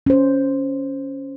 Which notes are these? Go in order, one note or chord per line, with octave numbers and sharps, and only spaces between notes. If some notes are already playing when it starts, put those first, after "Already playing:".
C#4 C5